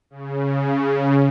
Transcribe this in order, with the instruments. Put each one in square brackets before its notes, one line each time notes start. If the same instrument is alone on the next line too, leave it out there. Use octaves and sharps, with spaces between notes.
[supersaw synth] C#3